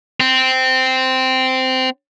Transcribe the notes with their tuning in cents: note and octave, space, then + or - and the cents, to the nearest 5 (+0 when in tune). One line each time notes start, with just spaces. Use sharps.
C4 -10